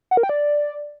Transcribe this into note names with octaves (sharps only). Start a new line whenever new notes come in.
F#5
A#4
G5
D5